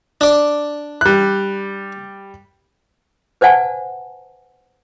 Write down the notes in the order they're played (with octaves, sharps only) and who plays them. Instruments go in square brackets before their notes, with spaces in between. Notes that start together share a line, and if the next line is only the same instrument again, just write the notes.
[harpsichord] D4 D5
[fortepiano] G3 F#6
[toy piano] B4 C5 D5 F#5 G#5 A5